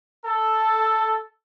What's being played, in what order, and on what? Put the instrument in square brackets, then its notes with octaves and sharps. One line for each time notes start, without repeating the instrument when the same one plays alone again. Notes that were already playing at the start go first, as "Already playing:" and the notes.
[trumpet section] A4